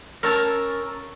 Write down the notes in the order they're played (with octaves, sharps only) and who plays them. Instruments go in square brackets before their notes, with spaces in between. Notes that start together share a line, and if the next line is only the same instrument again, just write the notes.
[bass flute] C#4 [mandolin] A#4 [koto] C#5 A5 [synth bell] C#6 E6 A6